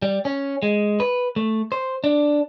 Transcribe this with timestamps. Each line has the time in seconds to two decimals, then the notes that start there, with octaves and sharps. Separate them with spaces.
0.02 G3
0.25 C#4
0.63 G#3
1.00 B4
1.36 A3
1.72 C5
2.04 D4